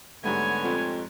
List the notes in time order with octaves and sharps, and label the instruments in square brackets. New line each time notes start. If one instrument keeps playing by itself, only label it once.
[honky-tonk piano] G#2 G3 A3 [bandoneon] D3 B3 [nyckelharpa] C#5 G#5
[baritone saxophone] F2